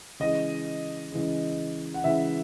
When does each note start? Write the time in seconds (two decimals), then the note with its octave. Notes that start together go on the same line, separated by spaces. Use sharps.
0.20 C#3 E3 G#3 D#5
1.12 C#3 E3 G#3
1.94 F#5
2.04 C#3 E3 G#3 E5